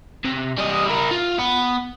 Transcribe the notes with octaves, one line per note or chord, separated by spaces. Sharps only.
C3
G3 D#5
E4 A#4
F4
B3